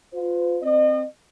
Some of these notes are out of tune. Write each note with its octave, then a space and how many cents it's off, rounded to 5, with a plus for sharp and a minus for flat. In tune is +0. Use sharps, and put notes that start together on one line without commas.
F4 +15 C5 -45
C4 +0 D#5 -40